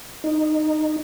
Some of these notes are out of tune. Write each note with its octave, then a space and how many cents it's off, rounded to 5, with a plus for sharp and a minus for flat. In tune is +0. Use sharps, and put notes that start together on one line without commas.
D#4 -15